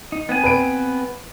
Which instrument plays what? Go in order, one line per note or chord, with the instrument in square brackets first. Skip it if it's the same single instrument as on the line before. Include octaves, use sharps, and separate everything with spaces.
[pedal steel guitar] D#4
B3 C4 G#5
[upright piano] B4 D7